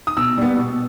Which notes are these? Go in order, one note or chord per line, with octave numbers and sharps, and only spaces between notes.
D#6
B2 E6
G3 B3
B2